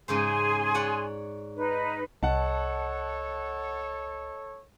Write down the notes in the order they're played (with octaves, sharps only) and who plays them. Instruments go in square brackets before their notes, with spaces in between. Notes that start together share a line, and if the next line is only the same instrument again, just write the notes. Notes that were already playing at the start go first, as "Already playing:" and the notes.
[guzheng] G#2 C#3 C5 [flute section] G#4 G#5 C6
[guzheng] C#5 D5 F#5
[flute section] D#4 B4
[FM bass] C2 [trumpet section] A4 C#5 [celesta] D#5 [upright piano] F#5 A5